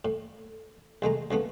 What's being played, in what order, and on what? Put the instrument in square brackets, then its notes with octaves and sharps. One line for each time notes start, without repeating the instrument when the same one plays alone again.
[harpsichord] A2
C2 G#3 A3 A#5
C#2 F3 A3 B3